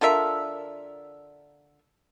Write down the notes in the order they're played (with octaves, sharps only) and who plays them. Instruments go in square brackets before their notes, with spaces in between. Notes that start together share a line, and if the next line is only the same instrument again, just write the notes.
[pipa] D3 F4 A#4 E5